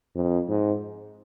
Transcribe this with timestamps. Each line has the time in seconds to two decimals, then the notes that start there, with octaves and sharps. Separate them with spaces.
0.16 F2
0.49 G#2